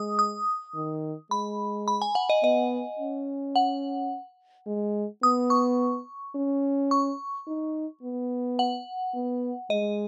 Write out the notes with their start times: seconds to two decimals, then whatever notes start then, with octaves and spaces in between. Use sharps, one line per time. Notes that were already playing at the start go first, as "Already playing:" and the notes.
Already playing: G#3 D#6
0.19 D#6
0.75 D#3
1.31 G#3 B5
1.88 B5
2.02 G#5
2.15 F#5
2.30 D#5
2.44 B3 D#5
2.99 C#4
3.56 F#5
4.67 G#3
5.23 B3 D#6
5.50 C#6
6.35 C#4
6.91 C#6
7.47 D#4
8.03 B3
8.59 F#5
9.14 B3
9.70 G#3 D#5